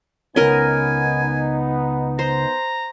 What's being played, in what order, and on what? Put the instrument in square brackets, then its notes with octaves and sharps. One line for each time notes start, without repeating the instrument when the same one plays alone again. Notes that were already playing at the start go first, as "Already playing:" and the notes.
[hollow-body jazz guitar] C#2 C#4 [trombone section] B3 D#4 [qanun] A#4 D#5 [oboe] G#5
[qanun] C5 [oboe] A#5